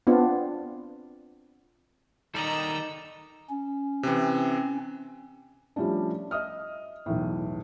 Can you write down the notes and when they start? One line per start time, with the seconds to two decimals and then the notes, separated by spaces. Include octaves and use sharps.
0.07 B3 C4 D4 F4
2.35 D#3 G3 D#4 A4 D5 D#5 A#5 E6
3.50 C#4
4.03 C3 E3 C4
5.76 F3 G3 A3 C#4 D4
6.31 D#5 E5 D#6 F6
7.06 B1 E2 A2